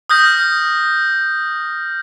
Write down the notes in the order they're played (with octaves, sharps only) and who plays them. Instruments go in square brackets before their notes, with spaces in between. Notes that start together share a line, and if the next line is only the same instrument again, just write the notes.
[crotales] D#6 F6 G6 A#6